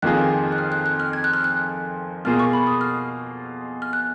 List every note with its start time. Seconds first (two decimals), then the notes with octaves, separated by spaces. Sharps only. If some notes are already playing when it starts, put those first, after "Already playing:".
0.02 F2 D#3 A#3 F4 G#4 F#6
0.52 F#6
0.58 F6
0.72 F#6
0.86 F#6
1.00 F6
1.13 G#6
1.24 F#6
1.33 F6
1.44 F#6
2.25 B2 A#3 F4 G#4 F6
2.39 C#6
2.53 B5
2.67 D#6
2.81 F6
3.82 F6
3.93 F#6